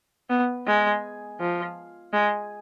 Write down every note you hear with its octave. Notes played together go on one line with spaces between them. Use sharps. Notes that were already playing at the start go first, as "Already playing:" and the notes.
B3
G#3
F3
G#3